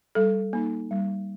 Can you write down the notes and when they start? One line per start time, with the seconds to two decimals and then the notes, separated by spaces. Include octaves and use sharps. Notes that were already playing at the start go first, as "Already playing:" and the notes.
0.15 G3 A4
0.53 A#3 D#4
0.91 G3